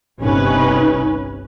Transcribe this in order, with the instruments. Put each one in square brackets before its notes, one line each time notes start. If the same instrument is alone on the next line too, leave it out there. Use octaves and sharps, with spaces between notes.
[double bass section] G1 C2 C3 [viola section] C#4 B4 [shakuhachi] D#4